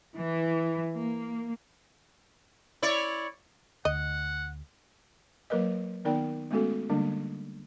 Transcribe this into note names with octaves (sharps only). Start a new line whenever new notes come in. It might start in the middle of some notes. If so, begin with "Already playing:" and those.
E3
A#3
E4 C#5 D5
D2 D#5 F#5
F#3 A#3 A#4 B4 D#5
D#3 B3 D#4 A#4 D5 G5
G#3 A3 B3 C#4 F#4 A4
D3 G3 G#3 A#3 D4